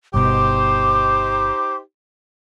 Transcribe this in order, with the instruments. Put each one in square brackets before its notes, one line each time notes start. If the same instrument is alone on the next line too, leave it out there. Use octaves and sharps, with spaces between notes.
[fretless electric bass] G1 B2 [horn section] D#4 G4 C5 [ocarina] D6